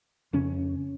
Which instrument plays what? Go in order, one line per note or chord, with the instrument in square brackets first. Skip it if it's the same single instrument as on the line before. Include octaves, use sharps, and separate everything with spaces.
[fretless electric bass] F2 C#3 C#4